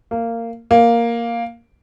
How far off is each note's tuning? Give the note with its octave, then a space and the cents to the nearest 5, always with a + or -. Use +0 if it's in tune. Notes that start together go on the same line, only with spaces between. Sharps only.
A#3 -20
A#3 +0